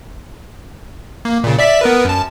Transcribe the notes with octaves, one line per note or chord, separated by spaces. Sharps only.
A#3
A#2 C#3
D5 E5 B6
B3 A#4 B4
F#2 A5